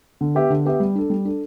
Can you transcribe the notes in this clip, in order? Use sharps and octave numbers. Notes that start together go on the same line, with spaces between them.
D3
B3 G4 E5
D3
B3 G4 E5
G3
D4 A4
G3
D4 A4